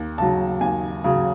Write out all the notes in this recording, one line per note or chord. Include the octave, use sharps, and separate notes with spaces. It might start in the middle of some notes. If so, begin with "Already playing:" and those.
Already playing: D#2
C#3 F#3 A5
D#2 G#5
C#3 F#3